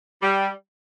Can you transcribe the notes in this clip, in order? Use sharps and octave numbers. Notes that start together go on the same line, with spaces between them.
G3